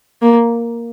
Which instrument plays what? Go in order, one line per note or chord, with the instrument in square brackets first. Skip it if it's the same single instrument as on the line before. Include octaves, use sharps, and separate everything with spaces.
[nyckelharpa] A#3